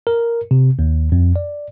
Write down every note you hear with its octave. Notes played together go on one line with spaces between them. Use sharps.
A#4
C3
D#2
F2
D5